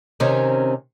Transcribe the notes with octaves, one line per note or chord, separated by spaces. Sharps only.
C3 D#3 C#4